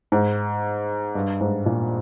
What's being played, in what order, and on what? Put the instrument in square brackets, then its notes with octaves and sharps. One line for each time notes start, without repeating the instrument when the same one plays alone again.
[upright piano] G#2
G2
G#2
A#2